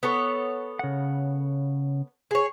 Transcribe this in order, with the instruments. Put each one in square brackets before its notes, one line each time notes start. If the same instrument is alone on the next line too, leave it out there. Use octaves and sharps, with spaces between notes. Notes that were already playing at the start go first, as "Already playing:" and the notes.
[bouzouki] B3 A4 C#5
[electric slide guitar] C#3 F#5
[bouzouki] G#4 C#5